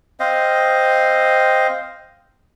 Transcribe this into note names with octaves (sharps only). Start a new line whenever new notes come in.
C4 C5 D#5 F5